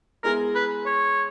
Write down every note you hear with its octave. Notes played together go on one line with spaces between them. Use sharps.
G#3 B3 E4 G#4 A#4
B4
C#5